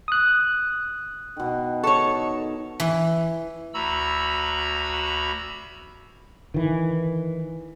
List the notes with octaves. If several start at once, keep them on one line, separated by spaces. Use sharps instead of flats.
D#6 F#6
B2 D#3
D#4 A4 C#5 C#6
E3
D2 F#4 A#5 B5 E6
D#3 E3